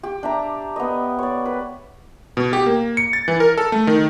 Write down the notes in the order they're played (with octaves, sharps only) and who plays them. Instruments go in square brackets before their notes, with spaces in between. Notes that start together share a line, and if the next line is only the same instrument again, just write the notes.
[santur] G4
D4 E5 A#5
B3 D#5
C#5 D5
B4
[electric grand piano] B2
G4
A#3
C#7
A6
E3
A#4
A4
A3
D#3